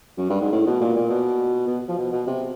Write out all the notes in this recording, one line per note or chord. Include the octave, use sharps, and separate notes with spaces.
F#2
G2
G#2
A2
B2
A#2
A#2
B2
B2
F3
B2
B2
C3